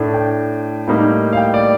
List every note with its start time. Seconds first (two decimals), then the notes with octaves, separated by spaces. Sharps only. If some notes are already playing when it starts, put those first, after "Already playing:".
Already playing: A2 A3 D4
0.14 G5
0.88 A2 G3 A#3 D#4
1.33 F5
1.37 G5
1.54 D5